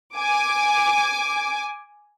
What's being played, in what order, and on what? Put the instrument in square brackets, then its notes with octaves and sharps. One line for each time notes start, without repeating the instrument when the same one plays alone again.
[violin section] G#5 D6